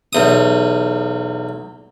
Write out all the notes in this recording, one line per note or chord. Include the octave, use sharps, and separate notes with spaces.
B1 E2 D#6